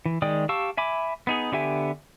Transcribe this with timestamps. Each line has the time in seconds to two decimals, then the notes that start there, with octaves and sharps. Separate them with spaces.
0.06 E3
0.22 D#3 G#3 D5 G5 D#6
0.49 G4 F5 A5 C#6 E6
0.77 E5 G#5 B5 D6
1.27 B3 D#4 G#4
1.52 D3 B3 G4 E5 G#5